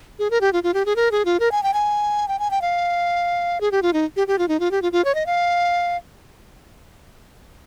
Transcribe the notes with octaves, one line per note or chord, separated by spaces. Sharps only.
G#4
A#4
G4
F4
F4
G4
G#4
A#4
G#4
F4
A#4
G#5
G5
G#5
G5
G#5
G5
F5
G#4
G4
F4
D#4
G4
G4
F4
D#4
F4
G4
F4
F4
C#5
D#5
F5